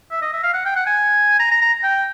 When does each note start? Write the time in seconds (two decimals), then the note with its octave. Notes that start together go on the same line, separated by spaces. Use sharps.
0.11 E5
0.22 D#5
0.33 E5
0.43 F5
0.54 F#5
0.65 G5
0.76 F#5
0.86 G#5
1.40 A#5
1.51 A#5
1.62 A#5
1.83 G5